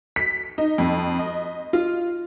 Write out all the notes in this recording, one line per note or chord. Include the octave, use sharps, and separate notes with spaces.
B6
D#4
F2
D#5
F4